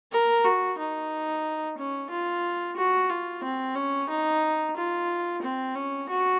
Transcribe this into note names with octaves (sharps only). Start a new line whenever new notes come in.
A#4
F#4
D#4
C#4
F4
F#4
F4
C4
C#4
D#4
F4
C4
C#4
F#4